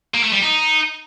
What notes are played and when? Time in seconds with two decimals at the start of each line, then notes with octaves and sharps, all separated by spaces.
0.14 A#3
0.23 A3
0.33 G3
0.42 D#4